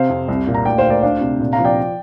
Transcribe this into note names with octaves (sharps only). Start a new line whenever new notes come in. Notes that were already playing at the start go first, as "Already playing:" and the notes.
Already playing: C3 C5 F5
F2
C2
A#2
A#5
D2 D5 G5
C5 F5
D2
A#4 D5
D4 C5 F5
C3
A#2
F5 A#5
F3
D5 G5